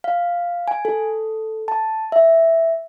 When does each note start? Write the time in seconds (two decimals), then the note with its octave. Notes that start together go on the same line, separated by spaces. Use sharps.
0.04 F5
0.68 G#5
0.85 A4
1.68 A5
2.12 E5